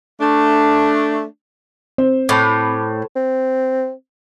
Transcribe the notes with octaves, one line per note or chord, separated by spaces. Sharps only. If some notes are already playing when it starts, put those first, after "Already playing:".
A3 D4
C4 C5
A2 A5 B5 D6
C4